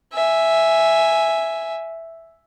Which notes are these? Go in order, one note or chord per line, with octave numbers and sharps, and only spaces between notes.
E5 G#5